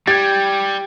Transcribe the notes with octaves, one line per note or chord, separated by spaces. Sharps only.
G3 G4 G#6 A6